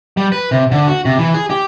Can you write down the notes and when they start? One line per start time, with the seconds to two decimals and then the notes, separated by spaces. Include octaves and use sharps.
0.17 G3
0.32 B4
0.51 C3
0.71 D3
0.87 F#4
1.05 C3
1.18 E3
1.34 G#4
1.50 G4